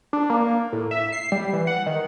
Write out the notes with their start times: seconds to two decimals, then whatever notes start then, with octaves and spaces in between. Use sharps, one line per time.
0.13 D4
0.30 A#3
0.72 A2
0.91 E5
1.12 C7
1.32 G3
1.53 E3
1.67 F#5
1.86 D#3